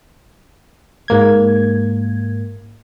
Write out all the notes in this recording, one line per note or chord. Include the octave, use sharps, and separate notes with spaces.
G#2 A#3 G#6